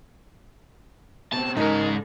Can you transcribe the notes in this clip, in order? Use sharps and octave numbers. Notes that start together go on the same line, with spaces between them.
B2 C4 A5
G#2 C#3 G#3 D#4 A4 A#4